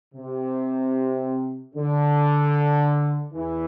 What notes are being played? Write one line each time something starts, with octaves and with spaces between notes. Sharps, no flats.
C3
D3
E2 E3